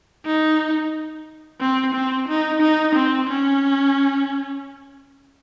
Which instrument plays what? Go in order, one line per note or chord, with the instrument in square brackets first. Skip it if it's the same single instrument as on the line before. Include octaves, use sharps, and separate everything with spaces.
[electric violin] D#4
C4
C4
D#4
D#4
C4
C#4